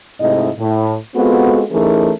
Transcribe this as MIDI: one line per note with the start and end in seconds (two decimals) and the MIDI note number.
0.20 0.50 44
0.20 0.50 48
0.20 0.50 57
0.20 0.50 64
0.20 0.50 75
0.58 0.95 45
1.16 1.63 56
1.16 1.63 59
1.16 1.63 60
1.16 1.63 65
1.16 1.63 66
1.16 1.63 69
1.71 2.12 52
1.71 2.12 57
1.71 2.12 61
1.71 2.12 63
1.71 2.12 68
1.71 2.12 70